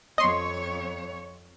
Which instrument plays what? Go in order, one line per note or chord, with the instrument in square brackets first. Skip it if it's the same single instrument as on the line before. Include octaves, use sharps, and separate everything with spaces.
[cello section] F2 C#5 [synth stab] D#5 C6